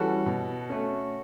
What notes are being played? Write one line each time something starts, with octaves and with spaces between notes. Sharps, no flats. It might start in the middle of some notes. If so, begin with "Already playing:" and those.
Already playing: E3 G3 C#4 F#4 A4
B2
A3 C#4